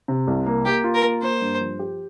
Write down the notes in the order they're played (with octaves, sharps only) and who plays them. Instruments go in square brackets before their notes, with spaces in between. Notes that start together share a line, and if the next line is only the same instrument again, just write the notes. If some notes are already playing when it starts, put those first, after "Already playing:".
[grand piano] C3
C2
A#3
[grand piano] A#3 [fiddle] G4
[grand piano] F4
[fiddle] A#4
[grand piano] A#3
[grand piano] A#3 [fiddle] C5
[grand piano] G2
F3
G4